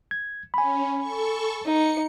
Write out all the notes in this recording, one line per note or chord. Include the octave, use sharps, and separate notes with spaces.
G#6
C#4 G#5 B5
A4 C#6
D#4 C#7